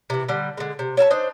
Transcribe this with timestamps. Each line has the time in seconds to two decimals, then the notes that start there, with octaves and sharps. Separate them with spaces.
0.10 C3 E3
0.29 D3 G3
0.57 D3 G#3
0.79 C3
0.97 C#5 E5 F5 A5
1.10 D4 D#4 C5